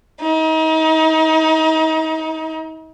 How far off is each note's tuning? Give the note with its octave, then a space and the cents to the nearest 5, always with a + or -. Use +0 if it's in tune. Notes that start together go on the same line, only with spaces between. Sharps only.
D#4 +35